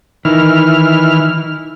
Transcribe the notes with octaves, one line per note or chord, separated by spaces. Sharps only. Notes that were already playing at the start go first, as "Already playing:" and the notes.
D#3 E3 F6